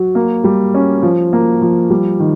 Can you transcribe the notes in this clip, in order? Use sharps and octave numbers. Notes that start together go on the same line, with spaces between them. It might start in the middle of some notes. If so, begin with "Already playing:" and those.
Already playing: F#3
A#3
G3
C#4
F3
A#3
F3
G3
D#3